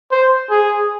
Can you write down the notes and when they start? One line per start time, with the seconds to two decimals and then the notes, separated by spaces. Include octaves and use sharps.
0.12 C5
0.50 G#4